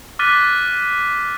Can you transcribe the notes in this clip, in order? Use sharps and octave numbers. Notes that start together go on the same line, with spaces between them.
D6 F6 F#6 A6 B6 D#7